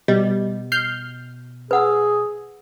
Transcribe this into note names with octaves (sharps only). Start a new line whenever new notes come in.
B2 G3 D#5
F6 G6 C7
G#4 B4 F#5 E6